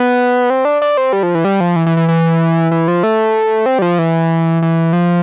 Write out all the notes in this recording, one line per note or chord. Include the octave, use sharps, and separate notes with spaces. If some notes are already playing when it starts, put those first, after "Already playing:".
Already playing: B3
C4
D4
D4
C4
G3
F3
E3
G3
F3
E3
E3
E3
E3
E3
F3
A3
C4
G3
F3
E3
E3
F3